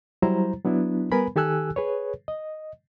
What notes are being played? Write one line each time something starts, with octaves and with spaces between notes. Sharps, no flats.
F#3 G3 E4 C5 A#5
F#3 B3 D4 E4
G3 B3 A#4 B4 G#5 B5
D#3 G4 A4 G#5 E6 F#6
G#4 B4 C#5
D#5